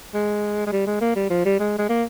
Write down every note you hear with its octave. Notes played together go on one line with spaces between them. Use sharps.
G#3
G#3
G3
G#3
A#3
G3
F3
G3
G#3
G#3
A#3